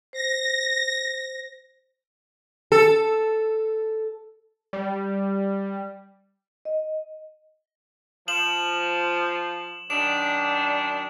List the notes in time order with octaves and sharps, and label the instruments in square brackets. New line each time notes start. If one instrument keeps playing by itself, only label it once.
[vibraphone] C5 [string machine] A#6
[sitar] A4
[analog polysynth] G3
[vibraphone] D#5
[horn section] F3 [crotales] E7 F#7
[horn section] F#2 D#3 D4 [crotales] E7